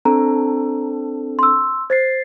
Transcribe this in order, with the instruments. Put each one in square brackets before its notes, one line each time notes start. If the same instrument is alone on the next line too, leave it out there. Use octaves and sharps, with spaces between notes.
[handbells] C4 D4 A4 [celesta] A#5
[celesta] C6 E6
[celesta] C5 [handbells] G#6 A6 C7